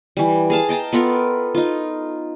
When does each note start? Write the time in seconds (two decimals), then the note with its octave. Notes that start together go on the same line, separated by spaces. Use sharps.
0.17 E3 G3
0.50 G#4 F5 A5
0.69 D#5 G5 A5 A#5
0.93 B3 F4 A4 A#4
1.55 D#4 F4